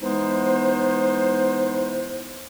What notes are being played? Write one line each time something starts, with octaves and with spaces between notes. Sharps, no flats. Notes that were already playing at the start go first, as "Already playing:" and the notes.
E3 G#3 B3 D#4 C5